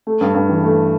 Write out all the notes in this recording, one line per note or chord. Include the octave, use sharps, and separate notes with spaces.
A3
G2
G2
E3
A3